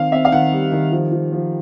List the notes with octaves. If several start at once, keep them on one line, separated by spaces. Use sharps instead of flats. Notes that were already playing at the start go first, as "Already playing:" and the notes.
Already playing: D#3 C4 F5
C4 E5
F5
D#3 F#5
G3
D#3
F3
F3
F3